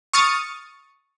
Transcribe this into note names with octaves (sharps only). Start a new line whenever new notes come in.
C#6 D#6 F6 A6 C#7